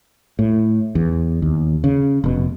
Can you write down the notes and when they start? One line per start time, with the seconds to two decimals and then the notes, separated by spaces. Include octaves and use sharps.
0.39 A2
0.95 E2
1.42 D#2
1.84 C#3
2.24 F1 B2